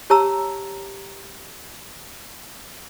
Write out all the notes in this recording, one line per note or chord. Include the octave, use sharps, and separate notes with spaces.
G4 C#5 A5 A#5 E6